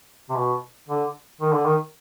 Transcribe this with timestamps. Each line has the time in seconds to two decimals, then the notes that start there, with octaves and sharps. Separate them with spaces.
0.30 C3
0.37 B2
0.89 D3
1.41 D#3
1.53 D3
1.65 D#3